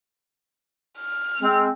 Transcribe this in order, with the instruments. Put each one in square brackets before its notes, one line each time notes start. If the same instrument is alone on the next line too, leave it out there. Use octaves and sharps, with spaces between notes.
[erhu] F6
[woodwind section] G#3 C4